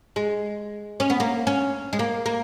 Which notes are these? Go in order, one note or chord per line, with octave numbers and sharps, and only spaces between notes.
G#3
C#4
B3
A#3
C#4
G#3
A#3
A#3